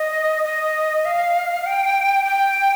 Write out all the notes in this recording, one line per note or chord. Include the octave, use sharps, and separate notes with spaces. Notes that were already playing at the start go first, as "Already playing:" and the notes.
Already playing: D#5
D#5
F5
G5
G5